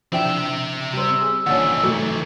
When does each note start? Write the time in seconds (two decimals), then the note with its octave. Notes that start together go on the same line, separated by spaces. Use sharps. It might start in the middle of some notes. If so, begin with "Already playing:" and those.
0.13 F3 C4 D4 E4 E5 G5
0.93 G3 C5 E6
1.21 G#4
1.46 A#1 D#3 E3 C#4 F#5 A5
1.83 G#1 F#3 A3